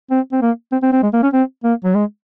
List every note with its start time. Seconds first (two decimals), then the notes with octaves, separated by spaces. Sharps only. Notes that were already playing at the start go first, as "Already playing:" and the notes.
0.11 C4
0.32 C4
0.42 A#3
0.72 C4
0.82 C4
0.93 C4
1.03 G#3
1.13 A#3
1.23 C#4
1.33 C4
1.64 A#3
1.84 F#3
1.95 G#3